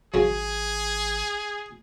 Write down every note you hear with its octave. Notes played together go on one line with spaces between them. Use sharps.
G#1 C#3 F#3 G#4